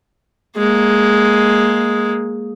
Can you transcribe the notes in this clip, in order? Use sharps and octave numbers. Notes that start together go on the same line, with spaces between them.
G#3 A#3